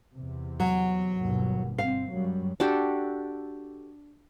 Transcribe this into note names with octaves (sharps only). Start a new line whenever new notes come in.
E2 C3
F#3
G1 D#2 B2
G2 C4 F5
F#2 F#3 G3
D4 F#4 G4 A4